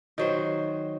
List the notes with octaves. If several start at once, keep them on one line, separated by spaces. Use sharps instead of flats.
D#3 F#3 C5